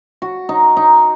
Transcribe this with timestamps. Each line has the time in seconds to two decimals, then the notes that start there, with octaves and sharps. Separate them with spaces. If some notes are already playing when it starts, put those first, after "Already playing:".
0.22 F#4
0.49 D#4
0.77 D#4